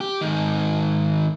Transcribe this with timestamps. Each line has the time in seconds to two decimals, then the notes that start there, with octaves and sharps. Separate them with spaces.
0.01 G4
0.21 G#2 D#3